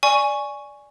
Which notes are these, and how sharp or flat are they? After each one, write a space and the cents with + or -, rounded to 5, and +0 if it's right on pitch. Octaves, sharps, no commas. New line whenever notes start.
D5 +0 G#5 +0 C#6 +0